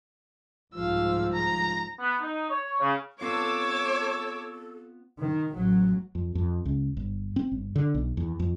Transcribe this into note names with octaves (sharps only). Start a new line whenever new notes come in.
C2 G#2 F3 F5 E6
A#5
B3
D#4
C#5
C#3
B3 C4 F4 A4 C#5 D6 E6
D#3
A1 F#3
F2
F2
C#2
G1
C4
G1
D3
B1
E2
F2